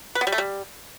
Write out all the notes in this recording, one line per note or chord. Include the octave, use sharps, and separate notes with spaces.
B4
B3
G3
A3
G3